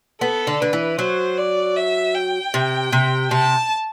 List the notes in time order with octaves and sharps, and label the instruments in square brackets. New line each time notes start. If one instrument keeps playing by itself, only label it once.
[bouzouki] B3 [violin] A4
[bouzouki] D3
[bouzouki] D3 [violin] B4
[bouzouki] E3
[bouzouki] F#3 [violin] C5
[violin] D5
E5
G5
[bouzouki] C3
C3
[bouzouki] C3 [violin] A5